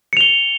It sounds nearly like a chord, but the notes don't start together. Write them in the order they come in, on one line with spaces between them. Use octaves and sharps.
C#7 F7 G7